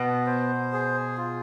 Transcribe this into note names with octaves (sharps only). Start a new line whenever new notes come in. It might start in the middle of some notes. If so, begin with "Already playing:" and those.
Already playing: B2 B3
C5
G#4
F4